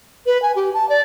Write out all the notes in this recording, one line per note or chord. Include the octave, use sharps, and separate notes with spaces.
B4
G#5
G4
A5
D5